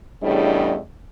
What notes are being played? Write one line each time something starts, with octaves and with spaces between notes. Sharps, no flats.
E2 A2 C#3 G3 D4 D#5